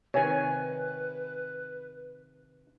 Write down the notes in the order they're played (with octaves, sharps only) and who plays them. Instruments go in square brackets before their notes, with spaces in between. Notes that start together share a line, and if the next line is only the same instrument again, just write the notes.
[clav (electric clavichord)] C3 D#3 [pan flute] B4 [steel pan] C#5 G#5